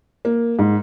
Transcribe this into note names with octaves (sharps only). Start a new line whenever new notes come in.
A#3
G#2